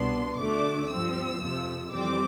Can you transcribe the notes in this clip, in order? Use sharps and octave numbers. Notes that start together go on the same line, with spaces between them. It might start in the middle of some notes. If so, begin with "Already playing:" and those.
Already playing: C2 B2 B3 D4 C6
D2 D3 A3 D4 D6
G2 F3 C4 E6
F2 C3 F3
F2 E3 G3 C4 D6